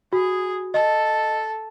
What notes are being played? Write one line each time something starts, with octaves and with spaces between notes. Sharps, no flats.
F#4 G#4
A4 D#5